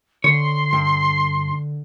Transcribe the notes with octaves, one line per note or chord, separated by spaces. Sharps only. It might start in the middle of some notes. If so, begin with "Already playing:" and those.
D3 C#5 C6
G2